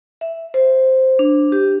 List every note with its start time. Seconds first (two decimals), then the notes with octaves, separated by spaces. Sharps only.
0.21 E5
0.54 C5
1.19 D4
1.52 G4